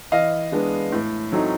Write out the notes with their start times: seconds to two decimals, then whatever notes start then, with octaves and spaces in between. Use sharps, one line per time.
0.12 E3 D#5 F5
0.52 G#3 B3 D4
0.92 A2
1.32 F#3 A3 C4 D#4